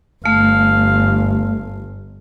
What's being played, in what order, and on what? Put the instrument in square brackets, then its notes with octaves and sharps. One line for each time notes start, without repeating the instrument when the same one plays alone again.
[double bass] G1 [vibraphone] A3 [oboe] F5